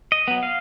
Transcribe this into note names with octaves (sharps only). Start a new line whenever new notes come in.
D#5
F#3 B3
F5